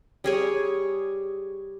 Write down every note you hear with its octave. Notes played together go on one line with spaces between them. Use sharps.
G3 G#4 C#5